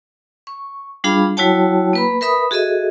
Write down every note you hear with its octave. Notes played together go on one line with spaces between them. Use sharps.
C#6
G3 D4 F4 G#4 F5 B5
F#3 E4 F#4 C#5 G5 A5
A#3 B4 B5
A#4 B4 E5 B5 D#6
F#4 G#4 A4 D#5 E5